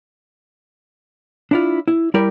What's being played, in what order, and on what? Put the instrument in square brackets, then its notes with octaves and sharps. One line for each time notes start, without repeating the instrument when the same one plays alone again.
[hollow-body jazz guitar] D4 E4 F4
E4
G3 E4 G4 A#4 D5